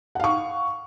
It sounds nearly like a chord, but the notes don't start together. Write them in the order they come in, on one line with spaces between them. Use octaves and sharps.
F#5 F5 C#6